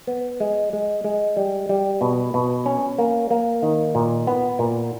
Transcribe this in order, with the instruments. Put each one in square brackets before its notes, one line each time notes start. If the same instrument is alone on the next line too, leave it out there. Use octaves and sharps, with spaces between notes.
[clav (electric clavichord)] B3
G#3
G#3
G#3
G3
G3
B2
B2
C#4
A#3
A#3
D#3
A#2
B3
A#2